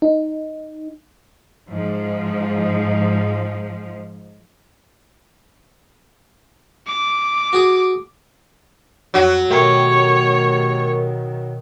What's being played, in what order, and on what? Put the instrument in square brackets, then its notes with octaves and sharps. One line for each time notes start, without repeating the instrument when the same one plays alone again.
[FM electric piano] D#4
[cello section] G#2 F3
[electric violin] D6
[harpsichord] F#4 G#4 D#6
[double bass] F2 [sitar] F#3 F#4
[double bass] B2 D#3 [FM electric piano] A3 G4 A#4 [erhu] C#5